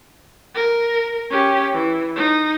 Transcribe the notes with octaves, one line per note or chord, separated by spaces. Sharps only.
A#4
C#4 G4
E3
D#4